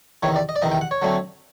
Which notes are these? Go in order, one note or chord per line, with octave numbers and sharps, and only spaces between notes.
E2 C3 D#3 C#5
D5
D#5
D5
E2 C3 D#3 D#5
G5
F#5
C#5
D3 F#3 A3 C4